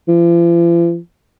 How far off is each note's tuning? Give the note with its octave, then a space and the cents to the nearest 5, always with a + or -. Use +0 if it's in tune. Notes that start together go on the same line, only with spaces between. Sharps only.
F3 -45